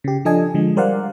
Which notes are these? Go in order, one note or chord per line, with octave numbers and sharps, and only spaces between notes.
C#3 G4
F3 D4 A4 D#5 G#5
D3 F3 G#3
G3 A#4 C5 D5 F5 F#5